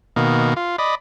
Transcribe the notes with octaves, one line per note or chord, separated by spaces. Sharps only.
B2 D#3 A#3
F4
D5 D#5 B5